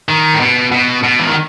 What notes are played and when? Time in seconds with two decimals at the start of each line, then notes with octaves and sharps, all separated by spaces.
0.09 D#3
0.34 A2
0.40 B2
0.72 B2
1.03 B2
1.19 E3
1.27 D#3